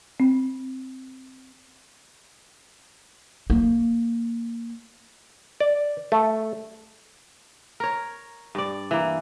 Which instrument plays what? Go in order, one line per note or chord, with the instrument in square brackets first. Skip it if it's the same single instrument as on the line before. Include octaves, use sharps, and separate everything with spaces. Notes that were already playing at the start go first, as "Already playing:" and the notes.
[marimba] C4
[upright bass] A#3
[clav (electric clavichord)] D5
A3
[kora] A#4 C#5
G2 D5
E3 A#3